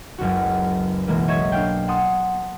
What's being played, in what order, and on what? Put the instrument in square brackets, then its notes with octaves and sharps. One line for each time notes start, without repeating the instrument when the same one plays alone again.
[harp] F#1 C#2 F#4
B1 E3 G#3 A#3
C#5 D#5 E5 C#6 G#6
D4 F5 G5
F#5 A5 C6 D#6